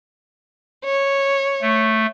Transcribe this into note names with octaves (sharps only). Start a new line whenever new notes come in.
C#5
A3